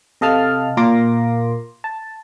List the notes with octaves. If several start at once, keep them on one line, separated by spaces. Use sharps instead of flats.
C3 A4 D#5 F5 A5 F6
A#2 F4 A#4 C6 D6 A#6
A5